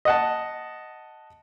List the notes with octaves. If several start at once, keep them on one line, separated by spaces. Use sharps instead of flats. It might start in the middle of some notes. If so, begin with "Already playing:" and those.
D#5 F#5 A5